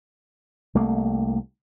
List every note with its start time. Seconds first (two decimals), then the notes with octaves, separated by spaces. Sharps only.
0.75 C2 A3 A#3